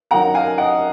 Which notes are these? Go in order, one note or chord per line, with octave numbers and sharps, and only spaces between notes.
F#2 D#3 F#5 A#5
F5 G#5
D#5 F#5